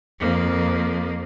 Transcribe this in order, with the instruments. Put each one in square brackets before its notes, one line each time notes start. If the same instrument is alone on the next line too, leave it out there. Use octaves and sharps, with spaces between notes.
[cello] F2 A#3